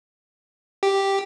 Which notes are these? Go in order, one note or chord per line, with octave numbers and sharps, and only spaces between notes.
G4